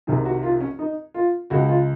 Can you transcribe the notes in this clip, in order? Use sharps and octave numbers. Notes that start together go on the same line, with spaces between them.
C2 C3 D#3 G#4
F#4
F4
C#4
D#4
F4
C#2 C#3 G#3 F#4
F4